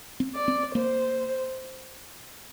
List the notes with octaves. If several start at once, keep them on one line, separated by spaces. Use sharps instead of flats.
C4
D5
C4
A#3 C5